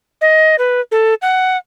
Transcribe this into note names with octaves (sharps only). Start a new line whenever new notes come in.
D#5
B4
A4
F#5